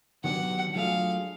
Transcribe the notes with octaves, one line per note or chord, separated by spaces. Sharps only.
D#3 F#3 B3 D4 G4 F#5
F#3 A3 D4 F4 G#4 F5